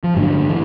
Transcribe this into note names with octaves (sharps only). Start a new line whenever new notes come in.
F3
A1 G2 D3 E3 F#3
E3